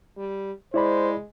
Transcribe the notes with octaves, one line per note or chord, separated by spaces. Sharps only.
G3
G#3 E4 C5 D5 B5